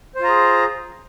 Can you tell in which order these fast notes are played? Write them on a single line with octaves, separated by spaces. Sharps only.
C5 F4 A#5 G#4